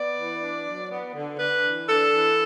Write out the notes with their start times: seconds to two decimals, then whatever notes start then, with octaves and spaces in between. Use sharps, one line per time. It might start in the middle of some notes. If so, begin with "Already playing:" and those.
Already playing: B3 D5
0.16 E3
0.41 D4
0.65 F#3
0.89 B3
1.13 D3
1.37 D4 B4
1.62 E3
1.86 D4 A4
2.11 E3